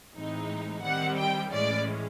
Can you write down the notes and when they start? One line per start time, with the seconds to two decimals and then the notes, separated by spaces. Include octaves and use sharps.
0.13 A2 E3 G#3 C4 D#4
0.82 D#3 G3 C4 F#5
1.17 G5
1.51 A2 E3 G#3 C#4 D5